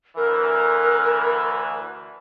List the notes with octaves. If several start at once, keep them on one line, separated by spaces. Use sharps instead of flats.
D2 D3 E3 A#4